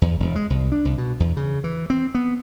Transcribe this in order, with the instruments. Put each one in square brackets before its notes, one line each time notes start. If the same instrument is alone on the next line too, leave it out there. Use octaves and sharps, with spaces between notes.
[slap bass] E2
E1
G#3
C2
D4
C2
B2
E2
C#3
E3
C4
B3